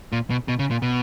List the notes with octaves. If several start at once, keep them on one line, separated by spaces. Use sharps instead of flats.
A#2
B2
B2
C#3
A#2
B2